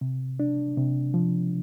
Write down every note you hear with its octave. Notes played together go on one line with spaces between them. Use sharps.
C3
D4
C3
F3